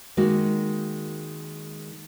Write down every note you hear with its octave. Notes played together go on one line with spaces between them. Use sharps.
D#3 G#3 A#3 F#4